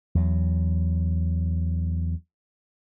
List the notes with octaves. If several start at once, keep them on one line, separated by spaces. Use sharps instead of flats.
E2 F#3